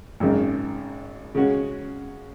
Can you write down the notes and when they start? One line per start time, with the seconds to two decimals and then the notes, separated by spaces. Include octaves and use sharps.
0.20 G#1 F#2 C#3 G#3 D#4
1.35 C#3 G#3 C#4 F#4